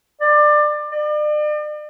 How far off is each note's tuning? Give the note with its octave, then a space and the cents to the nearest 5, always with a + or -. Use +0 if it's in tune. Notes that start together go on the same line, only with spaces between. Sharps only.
D5 +25
D5 +40